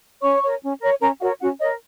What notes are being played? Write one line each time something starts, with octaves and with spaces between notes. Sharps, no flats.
C#4 C#5 C#6
A#4 C#5
C#4
A#4 C#5
C#4 A#4 A#5
F#4 A#4 C#5 F#5
C#4 F#4 F#5
A#4 C#5 D#5